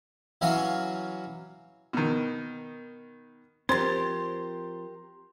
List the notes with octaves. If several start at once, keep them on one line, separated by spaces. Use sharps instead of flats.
E3 F#3 C#4 F#4 F5
B2 D#3
F3 C4 G4 A#4 C5 C6 A6